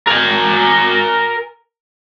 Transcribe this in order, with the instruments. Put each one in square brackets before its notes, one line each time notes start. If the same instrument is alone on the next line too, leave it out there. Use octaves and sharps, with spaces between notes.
[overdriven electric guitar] A#4 G#5